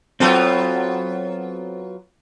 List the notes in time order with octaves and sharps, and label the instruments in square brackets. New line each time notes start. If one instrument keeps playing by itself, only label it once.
[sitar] F#3 B3 F4 [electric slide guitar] C4 A4